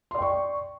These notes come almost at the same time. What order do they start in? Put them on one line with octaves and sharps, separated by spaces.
C6 D5 G5 C#6